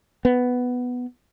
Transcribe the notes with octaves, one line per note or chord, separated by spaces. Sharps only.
B3